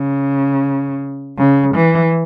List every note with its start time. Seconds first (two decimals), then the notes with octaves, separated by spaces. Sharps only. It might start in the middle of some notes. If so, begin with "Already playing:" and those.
Already playing: C#3
1.38 C#3
1.75 E3